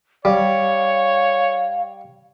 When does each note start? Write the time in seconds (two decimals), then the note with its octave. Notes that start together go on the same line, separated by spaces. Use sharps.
0.25 G3 C#5 F5